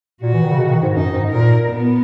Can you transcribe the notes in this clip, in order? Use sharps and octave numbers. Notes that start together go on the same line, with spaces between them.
A#2 F#4
E3
D#3
C#3
B2
D#3
G#2
F#2 D#4
G#2
A#2 A#4
B3